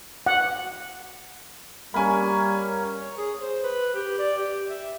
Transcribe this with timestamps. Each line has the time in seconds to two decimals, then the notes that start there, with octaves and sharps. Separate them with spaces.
0.26 F#5
1.94 G3 A#3 C#4 G#5 B5
3.01 C#5
3.17 G#4
3.41 C5
3.63 B4
3.95 G4
4.19 D5
4.38 G4
4.69 E5